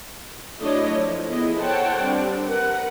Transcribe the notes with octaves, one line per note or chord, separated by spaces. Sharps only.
F#3 A3 D4 E4 C#5 D#5
F3
B3 E4 G#4 D#5
A4 C5 C#5 F#5 G5 A5
G3 C4 D4
A#4 B4 F#5